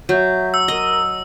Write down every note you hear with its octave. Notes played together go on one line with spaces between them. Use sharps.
F#3 E5 G6
E6
A#4 D#5